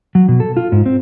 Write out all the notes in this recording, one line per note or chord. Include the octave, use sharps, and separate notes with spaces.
F#3
B2
A4
F4
G#2
C4